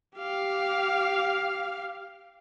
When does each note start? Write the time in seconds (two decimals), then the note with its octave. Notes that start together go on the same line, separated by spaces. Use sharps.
0.17 G4 F5